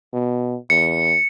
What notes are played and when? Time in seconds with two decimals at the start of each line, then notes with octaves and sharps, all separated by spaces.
0.13 B2
0.70 E2 C#7